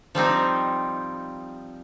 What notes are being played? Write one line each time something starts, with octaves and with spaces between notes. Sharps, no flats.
F3 G3 C4 D#4